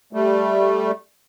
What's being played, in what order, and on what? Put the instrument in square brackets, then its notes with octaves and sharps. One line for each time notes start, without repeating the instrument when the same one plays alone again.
[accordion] G3 A3